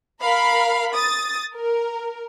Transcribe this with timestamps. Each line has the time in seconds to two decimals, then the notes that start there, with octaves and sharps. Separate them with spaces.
0.21 A#4 F5 B5
0.93 D#6 A6
1.56 A#4